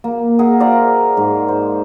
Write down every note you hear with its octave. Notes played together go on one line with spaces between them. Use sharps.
A#3
G#4 A#4 E5 F#5
C5 D5 F5 A#5
G#2
C5